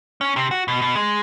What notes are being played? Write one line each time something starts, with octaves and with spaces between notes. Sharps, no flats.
C#4
C3
F#4
B2
B2
G#3